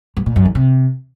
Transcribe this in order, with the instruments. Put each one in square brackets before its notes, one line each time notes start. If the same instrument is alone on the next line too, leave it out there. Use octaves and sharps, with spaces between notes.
[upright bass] G2
A#2
F#2
D#3
C3